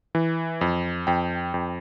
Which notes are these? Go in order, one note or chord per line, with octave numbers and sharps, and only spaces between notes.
E3
F2
F2 G5
F2